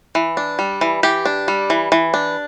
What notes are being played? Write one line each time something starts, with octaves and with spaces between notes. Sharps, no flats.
E3
D4
G3
E3
E3 G4
D4
G3
E3
E3
D4